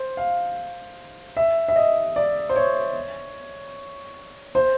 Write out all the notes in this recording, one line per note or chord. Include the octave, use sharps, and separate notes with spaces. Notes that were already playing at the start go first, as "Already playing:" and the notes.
Already playing: C5
F5
E5
E5
D#5
D5
C5
C#5
C5